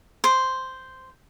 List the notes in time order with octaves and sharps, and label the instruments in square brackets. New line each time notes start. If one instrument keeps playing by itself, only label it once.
[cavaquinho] C5